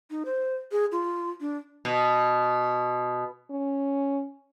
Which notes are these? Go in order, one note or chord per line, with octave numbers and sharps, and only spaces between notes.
D#4
C5
G#4
F4
D4
B2
C#4